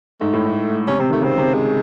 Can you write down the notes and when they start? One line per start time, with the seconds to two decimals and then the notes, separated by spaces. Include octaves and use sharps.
0.21 G#2 A3
0.34 A2
0.46 G#2
0.87 C3 C#4
0.99 C3 C4
1.10 D#3 A3
1.21 C#3 C4
1.38 C3
1.54 G#3